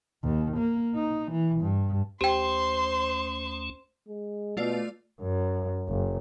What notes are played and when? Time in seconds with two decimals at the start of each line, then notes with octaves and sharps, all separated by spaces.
0.23 D#2
0.57 A#3
0.95 D#4
1.31 E3
1.60 G2
2.21 D#2 A3 C#4 G4 C5 G5 C6
4.08 G#3
4.57 B2 A3 F4 D5
5.21 F#2
5.88 F#1